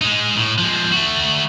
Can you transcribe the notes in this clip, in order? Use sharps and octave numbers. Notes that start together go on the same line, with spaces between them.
G#3 D#4
A2
F3 G#3
A3 F#4